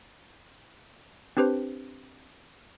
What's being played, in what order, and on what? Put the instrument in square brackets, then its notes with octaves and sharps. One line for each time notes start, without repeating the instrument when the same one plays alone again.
[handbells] C4 D4 G4 B4 C5